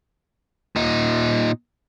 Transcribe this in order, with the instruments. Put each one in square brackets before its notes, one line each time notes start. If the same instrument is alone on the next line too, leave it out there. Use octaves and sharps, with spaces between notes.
[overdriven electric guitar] A#2 D#4